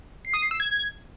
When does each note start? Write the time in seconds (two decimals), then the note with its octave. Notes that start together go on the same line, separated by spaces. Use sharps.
0.25 C7
0.34 D#6
0.42 C7
0.51 E6
0.60 G#6